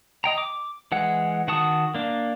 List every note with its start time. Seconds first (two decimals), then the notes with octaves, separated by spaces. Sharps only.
0.24 D#5 G5 A#5
0.38 D6
0.92 E3 G#3 F#5
1.48 D#3 F#4 F#5 A5 D#6
1.94 A#3 D4